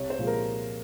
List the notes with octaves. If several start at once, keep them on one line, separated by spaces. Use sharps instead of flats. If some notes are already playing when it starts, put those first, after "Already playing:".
Already playing: C2 C#5
C5
A#2 F3 G#3
A#4